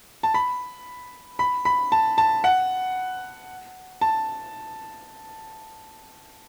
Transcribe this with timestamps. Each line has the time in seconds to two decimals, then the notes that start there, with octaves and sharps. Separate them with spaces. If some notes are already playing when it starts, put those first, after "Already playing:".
0.23 A5
0.34 B5
1.39 B5
1.65 B5
1.92 A5
2.18 A5
2.44 F#5
4.01 A5